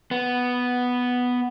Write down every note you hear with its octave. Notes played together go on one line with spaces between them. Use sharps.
B3